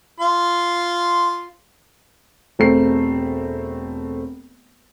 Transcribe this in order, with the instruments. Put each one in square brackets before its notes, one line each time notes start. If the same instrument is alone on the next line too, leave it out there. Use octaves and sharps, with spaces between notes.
[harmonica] F4 C6
[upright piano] E1 A3 C4 C7